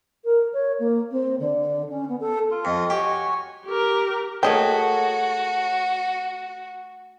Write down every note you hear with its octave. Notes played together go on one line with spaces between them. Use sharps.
A#4
C#5
A#3
C4
D3
C#4
B3
A4
F4
F2 D#5
F#4 G4 C#5 G#5
G4 A#4
A3 F#4 G#4 A#4 C#5 D#5 G5 A5